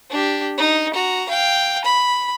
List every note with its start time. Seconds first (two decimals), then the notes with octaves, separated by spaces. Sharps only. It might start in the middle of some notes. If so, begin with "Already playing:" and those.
0.11 D4 G4
0.58 D#4
0.94 F#4 A#5
1.29 F5 G5
1.85 B5